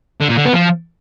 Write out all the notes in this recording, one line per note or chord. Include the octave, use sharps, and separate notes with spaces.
D3
A#2
D3
B3
F3